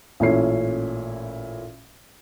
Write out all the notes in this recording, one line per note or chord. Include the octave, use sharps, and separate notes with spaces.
A1 A#2 A3 C#4 E4 C7